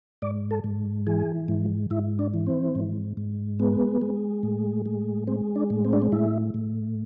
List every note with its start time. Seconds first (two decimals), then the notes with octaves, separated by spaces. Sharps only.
0.22 G#2 D5
0.51 A4
0.64 G#2
1.07 E3 G#4
1.48 G#2
1.90 G#2 E4
2.19 D4
2.34 E3
2.47 C4
2.75 G#2
3.17 G#2
3.59 G#3 B3
4.01 G#3
4.43 A2
4.86 G#3
5.27 G#3 C4
5.55 D4
5.70 A2
5.85 C4
5.93 D4
6.02 C4
6.12 A2 E4
6.54 A2